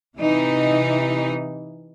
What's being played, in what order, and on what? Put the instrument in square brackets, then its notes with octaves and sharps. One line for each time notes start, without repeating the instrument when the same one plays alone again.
[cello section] C3 E3 D#4